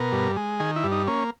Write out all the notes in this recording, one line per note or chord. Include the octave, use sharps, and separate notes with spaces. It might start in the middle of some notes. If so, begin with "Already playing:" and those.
Already playing: B2 A#4
G2
G#3
D#3 G#4
E4
G2
D#4
A#3 C#4